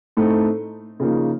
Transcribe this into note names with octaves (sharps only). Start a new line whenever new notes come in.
A2 A3 C4 D#4
C#3 F3 A#3 D#4